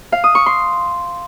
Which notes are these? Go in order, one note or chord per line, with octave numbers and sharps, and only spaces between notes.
F5
D#6
C#6
C6